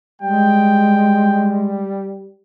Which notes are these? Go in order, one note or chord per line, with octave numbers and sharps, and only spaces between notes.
G3 G#3 G5